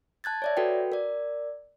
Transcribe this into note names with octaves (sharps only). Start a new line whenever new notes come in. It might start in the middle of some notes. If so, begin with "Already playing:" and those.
A5 F#6 G#6 A6
C#5 D5 E5
F#4 A4 B4 G5
A#4 D5